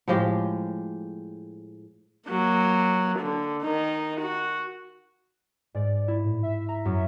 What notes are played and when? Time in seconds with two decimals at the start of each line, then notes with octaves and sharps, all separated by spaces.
0.08 A2 F3 G#3 G4
2.29 F#3 A#3
3.19 D3
3.63 D#3 D#4
4.21 F#4
5.75 G#2 D5
6.08 E4
6.25 A2
6.43 E5
6.69 A#5
6.85 F#2